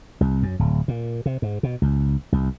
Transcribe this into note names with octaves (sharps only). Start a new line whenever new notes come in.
C2
F#2
D1
A#2
C3
G#2
B2
C#2
C2